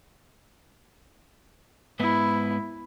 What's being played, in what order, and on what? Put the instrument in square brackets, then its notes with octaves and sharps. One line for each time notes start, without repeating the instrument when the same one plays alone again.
[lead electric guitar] G#2 B3 [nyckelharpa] E4